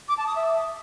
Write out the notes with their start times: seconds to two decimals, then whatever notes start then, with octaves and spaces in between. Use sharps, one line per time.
0.09 D6
0.18 A5
0.27 D#6
0.36 E5